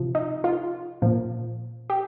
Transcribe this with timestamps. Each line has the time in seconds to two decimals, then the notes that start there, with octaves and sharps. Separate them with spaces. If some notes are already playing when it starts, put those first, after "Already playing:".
Already playing: C3 F3
0.15 D#4
0.44 F4
1.02 A#2 F3
1.90 G4